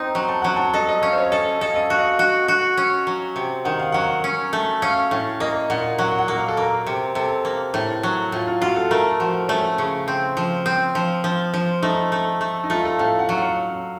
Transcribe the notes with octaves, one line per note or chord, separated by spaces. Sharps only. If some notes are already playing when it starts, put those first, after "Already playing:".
Already playing: C4 D#4 A#5
F#3 A#5
A5
F#3 F#5
A5
A4 D#5
D#5
C#4 F5
C5
C#5
A4 D#5
A4 D#5
F5
D#5
F#4 F5
D#5
F5
F#4
F#4
C#4
F#3
C3
D#3 F#5
F5
F#3 F#5
C#4
A3
C#4 F5
A2
A#3 D#5
A#2 F#5
F#3 F#5
F#5
A#3
F5
A4
A#3 A#4
C3
C3 A4
A#3
A2
F#3
A2 F4
F4
F4 F#4
A4
A3 A#4
F3 F#4
A3 C#4
C#3
C4
F3
C4
F3
F3
F3
A3 D#4
A3
A3
D#4
A3 F4
A4
A2 F5
F#5
F#3
F5